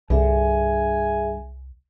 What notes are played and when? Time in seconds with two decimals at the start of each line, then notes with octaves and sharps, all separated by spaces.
0.10 C2 G2 D3 G#4 E5 G#5